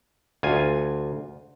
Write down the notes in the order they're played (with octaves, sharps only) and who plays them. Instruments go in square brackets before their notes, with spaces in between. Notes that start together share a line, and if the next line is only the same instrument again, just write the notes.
[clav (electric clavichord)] D2 F4 G#5